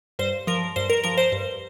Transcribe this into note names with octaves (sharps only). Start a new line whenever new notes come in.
G2 C5
F3 A#4
G2 C5
A#4
F3 A#4
C5
G2